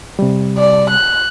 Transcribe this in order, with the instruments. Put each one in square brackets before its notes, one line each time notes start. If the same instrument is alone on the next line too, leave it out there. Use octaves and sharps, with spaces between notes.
[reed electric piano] C3 G3
[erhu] D5
F#6